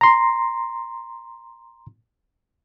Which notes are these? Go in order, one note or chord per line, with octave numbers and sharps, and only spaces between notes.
A#5 C6